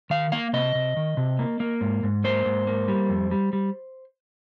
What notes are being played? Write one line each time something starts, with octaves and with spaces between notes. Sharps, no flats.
D#3 F5
A#3 F5
C3 D#5
C3
D#3
C3
A#3
A#3
G#2
G#2
A#3 C5
G#2
A#3
G3
F2
G3
G3